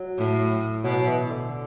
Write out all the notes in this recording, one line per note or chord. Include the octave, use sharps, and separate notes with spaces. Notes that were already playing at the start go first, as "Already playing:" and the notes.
Already playing: F#3
A2
B2 F#3
E3
D3